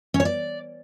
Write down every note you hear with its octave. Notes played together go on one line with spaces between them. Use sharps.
C#4
C#5
D5